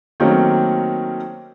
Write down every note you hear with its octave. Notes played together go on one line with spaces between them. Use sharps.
D#3 F#3 A3 A#3 C4 C#4